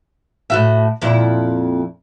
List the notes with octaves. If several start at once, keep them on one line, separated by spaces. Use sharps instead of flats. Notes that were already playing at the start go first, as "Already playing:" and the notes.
A2 F#4 E5
F2 A#2 E4